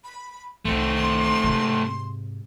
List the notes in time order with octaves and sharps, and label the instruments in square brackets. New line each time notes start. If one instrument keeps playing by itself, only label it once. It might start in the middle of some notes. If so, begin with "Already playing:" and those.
[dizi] B5
[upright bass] C2 D#3 [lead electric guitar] A3 C4 [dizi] C6
[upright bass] G#2 C3